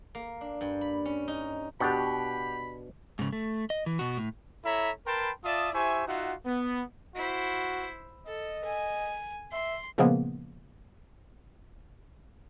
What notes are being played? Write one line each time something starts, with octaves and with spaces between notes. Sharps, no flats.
A#3
D4
G2
B5
C#4
D#4
B2 D4 G4 F#5 G5 B5
G#2 C#3
A3
D#5
E3
B2 F#4
A2
E4 A4 C#5 E5 A#5 B5
A#4 B4 G5 A5 B5 C6
F4 D5 E5 A5 D#6
E4 G4 C5 E5 G#5 C#6
D#4 F4 F#4 E5 F#5
B3
E4 F#4 C5
A4 D#5
G#5
E5 C6
A#2 C#3 F3 G#3 A#3 B3